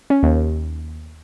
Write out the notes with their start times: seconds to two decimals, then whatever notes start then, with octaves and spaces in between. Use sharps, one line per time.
0.10 C#4
0.23 D#2